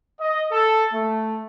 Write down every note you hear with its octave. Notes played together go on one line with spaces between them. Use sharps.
D#5
A4
A3